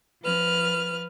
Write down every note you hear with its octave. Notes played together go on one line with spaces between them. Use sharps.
F3 B4 F6